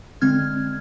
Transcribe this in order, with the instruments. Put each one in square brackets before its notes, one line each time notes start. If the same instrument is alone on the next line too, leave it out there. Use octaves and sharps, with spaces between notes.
[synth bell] D3 G#3 C4 F6 G#6